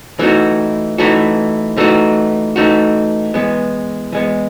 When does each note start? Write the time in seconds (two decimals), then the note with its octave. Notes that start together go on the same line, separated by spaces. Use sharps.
0.19 E3 A3 D#4 F#4
0.98 E3 A3 D#4 F#4
1.77 E3 A3 D#4 F#4
2.56 E3 A3 D#4 F#4
3.34 E3 G#3 B3
4.12 E3 G#3 B3